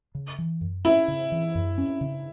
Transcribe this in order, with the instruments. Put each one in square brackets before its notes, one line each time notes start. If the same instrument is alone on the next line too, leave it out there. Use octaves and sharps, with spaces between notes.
[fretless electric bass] C#3
E3
F#2
[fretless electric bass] C#4 [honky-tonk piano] E4
[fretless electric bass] C#3
E3
F#2
C#4
C#3